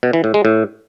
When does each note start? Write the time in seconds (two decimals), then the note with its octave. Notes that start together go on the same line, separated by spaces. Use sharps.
0.03 B2
0.13 E3
0.24 A2
0.34 G#3
0.45 A2